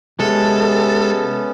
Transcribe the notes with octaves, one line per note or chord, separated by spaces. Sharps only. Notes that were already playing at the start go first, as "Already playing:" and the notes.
C3 G#3 B3 C#4 A4